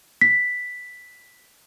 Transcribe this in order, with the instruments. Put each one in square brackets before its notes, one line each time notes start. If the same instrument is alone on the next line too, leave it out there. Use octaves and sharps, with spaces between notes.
[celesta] B6